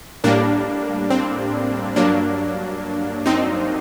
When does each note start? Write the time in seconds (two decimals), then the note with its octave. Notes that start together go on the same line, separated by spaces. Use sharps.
0.24 A2 G3 A#3 D4
1.10 C4
1.96 G2 F#3 A#3 D4
3.26 C4 D#4